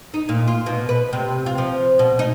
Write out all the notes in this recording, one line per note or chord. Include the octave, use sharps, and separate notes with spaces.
D#4
A#2
F4
B2
B4
C3
F4
F3
B2
D#4